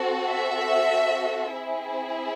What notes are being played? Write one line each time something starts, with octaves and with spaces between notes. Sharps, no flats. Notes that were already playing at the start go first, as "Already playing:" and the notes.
Already playing: C4 F#4 A4
E5
C4 E4 G#4